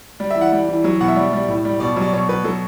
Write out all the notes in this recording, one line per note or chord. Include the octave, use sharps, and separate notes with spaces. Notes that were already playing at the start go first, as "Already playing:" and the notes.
G3
E5
E3
F#5
G3
E3
F#3
B2 F#5
E5
G3
G3
A2
G3
B2 D5
F#3
D5
B2 C#5
B2 B4
F#3 A4